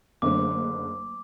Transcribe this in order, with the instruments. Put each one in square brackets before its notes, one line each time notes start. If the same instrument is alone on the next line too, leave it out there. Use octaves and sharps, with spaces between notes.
[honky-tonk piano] F#1 D3 [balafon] F#3 A3 A#3 [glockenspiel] D6